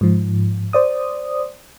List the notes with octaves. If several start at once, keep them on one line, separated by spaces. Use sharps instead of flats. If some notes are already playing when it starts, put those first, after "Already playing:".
G#2 F3
C5 D5 D#6